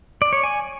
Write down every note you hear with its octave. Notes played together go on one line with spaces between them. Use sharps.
D5
C#5
G#5